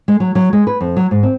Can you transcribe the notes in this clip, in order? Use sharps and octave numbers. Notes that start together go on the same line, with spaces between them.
G#3
F#3
F#3
G#3
B4
F2
F#3
G#2
C4